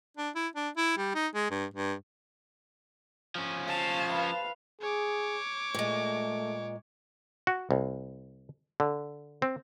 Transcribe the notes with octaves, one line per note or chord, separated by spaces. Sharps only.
D4
E4
D4
E4
G3
D#4
G#3
G2
G2
F3 C#4
C5 F5 A5
B4 F5
G#4 C#5 D6
A#2 G#3 A3
F#4
C2
D3
C4